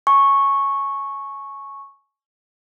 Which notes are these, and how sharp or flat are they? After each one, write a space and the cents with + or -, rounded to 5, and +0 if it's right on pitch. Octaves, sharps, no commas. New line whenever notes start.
G#5 +35 C#6 -10